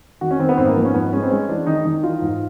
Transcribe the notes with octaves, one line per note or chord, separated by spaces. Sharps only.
D#3 F#4
C#4
D#3 C4
B3
G#2 C4
A#3
F3 B3
C#4
G#2 B3
G#3 C#4
C4
G#3 C#4
E3 D4
D#3 D#4
D#3 D#4
E3 F4
G#2